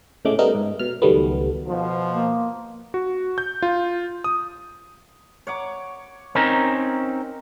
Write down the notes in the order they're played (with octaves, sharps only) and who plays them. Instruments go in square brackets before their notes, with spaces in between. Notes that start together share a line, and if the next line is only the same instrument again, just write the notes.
[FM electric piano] A2 C#3 G#3 A3 D6
G3 A3 B3 D#4 A#4
G#2
B2 F6
C#2 D#3 F#3 G3 A3 B3
[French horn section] B2 F3
[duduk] A#3
[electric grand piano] F#4
G6
F4
D#6
[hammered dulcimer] C#5 F#5 D6
[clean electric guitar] C4 C#4 D#4 [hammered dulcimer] A#4